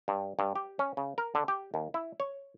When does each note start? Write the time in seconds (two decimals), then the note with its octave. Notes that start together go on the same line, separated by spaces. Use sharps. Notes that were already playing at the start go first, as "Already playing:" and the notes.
0.08 G2
0.39 G2
0.56 G4
0.79 C#4
0.97 C#3
1.18 A#4
1.35 D3
1.48 G4
1.74 D#2
1.94 E4
2.20 C#5